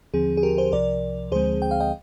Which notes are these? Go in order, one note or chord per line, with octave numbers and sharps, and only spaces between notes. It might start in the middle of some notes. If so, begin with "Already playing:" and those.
D#2 D3 F3 C4 G#4
G#4
G4 A#4
G#4 C5
C2 C3 F3 A#4 D5
D2 D3 F3 G#3 C4 G#4 C5
G5
F5
D#5 G5